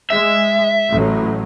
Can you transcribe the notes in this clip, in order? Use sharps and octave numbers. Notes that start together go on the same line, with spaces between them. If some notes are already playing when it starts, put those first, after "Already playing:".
G#3 E5
A1 A2 F#3